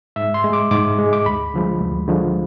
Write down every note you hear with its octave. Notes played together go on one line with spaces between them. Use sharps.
G#2 E5
C6
G#3
D6
G#2 D6
G#3
D6
D2 B5
D3 F3 G#3
D2
D3 F3 G#3